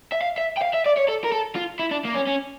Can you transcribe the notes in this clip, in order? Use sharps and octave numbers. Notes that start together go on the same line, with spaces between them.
E5
F5
E5
G5
F5
E5
D5
C#5
A4
A#4
A4
F4
E4
D4
A#3
C#4
C#4